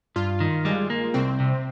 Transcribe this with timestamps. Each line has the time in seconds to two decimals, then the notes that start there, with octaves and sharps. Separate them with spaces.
0.16 G2 F4
0.40 D#3
0.65 G3 G#3
0.90 A#3
1.14 C2 C4
1.40 C3